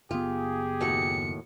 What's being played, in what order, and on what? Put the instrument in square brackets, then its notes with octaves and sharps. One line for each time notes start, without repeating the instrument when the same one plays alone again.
[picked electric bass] F#1 B3 [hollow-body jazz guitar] F4 [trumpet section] G4 G#4
[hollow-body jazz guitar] D#2 A2 F#4 [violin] C#7